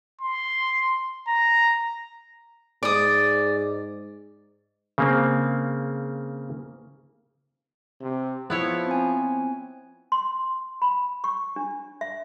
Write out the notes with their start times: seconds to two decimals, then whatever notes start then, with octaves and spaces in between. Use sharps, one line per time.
0.22 C6
1.28 A#5
2.83 G#2 D5 D#6
4.98 C#3 A#3 C4
8.01 C3
8.50 F3 B3 E4 C#5
8.87 C4 G#5
10.12 C6
10.82 B5
11.24 C#6
11.56 D4
12.01 E5